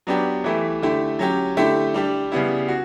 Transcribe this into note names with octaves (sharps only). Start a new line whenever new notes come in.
F#3 B3 D4 G4
E3 A3 E4 G4
D3 A3 E4 G4
F#3 C#4 G4
D3 A3 E4 G4
G3 D4 G4
C#3 G3 B3 E4
F#4